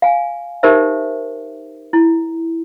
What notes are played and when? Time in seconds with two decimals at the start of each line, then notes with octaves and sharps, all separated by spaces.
0.02 F5 G#5
0.63 D#4 G4 A#4 C5 E5
1.93 E4